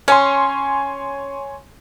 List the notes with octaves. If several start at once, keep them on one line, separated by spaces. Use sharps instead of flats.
C#4 C#5 G#5 C6